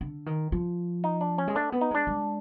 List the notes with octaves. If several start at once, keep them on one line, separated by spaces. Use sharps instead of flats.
D3
D#3
F3
D#4
D4
C#4
G#3
A3 D4
B3
D#4
G#3 D4
G#3